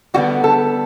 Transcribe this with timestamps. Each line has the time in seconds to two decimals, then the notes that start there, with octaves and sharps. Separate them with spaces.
0.14 D3 G3 B3 F#4
0.44 A4